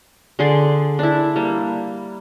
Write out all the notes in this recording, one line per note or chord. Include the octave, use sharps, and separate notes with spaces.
D3 G#4 D5 C6
D4 E4
G3 A#3